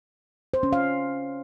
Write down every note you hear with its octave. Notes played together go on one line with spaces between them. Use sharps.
C5
C#4
F5